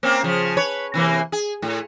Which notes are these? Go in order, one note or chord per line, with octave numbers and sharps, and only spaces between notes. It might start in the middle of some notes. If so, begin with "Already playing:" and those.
A#3 C4 C#4
C#3 F3
B4 C#5
C3 E3 A#3
G#4
A2